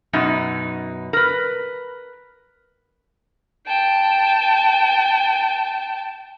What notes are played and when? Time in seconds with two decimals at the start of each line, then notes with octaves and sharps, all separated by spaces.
0.13 F#2 B2 D#4
1.13 A#4 B4
3.66 G5 A5